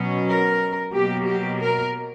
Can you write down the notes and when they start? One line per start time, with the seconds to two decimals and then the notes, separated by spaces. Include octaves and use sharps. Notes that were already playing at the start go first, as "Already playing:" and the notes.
Already playing: B2 F#3 C#4
0.28 A#4
0.93 B2 F#3 A#3 G4
1.28 G4
1.60 A#4